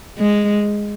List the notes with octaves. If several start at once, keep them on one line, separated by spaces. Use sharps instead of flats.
G#3